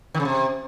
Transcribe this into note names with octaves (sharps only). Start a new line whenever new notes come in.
D#3
C#3
C3